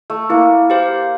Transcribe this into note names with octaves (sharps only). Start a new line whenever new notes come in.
A3
A#3 E4
G4 C5 F5